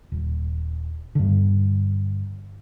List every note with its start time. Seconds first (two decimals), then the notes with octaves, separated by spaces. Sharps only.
0.12 D#1
1.15 G2 D3